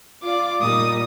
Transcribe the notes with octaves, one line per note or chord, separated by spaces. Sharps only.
F4 D5 D6
A#2 G3 D#4 D#6